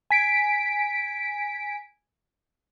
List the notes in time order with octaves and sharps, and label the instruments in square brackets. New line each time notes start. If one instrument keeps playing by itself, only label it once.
[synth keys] G#5 B6 D7